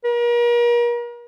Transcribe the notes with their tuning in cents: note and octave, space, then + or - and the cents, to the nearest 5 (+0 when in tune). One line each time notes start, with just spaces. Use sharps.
A#4 +40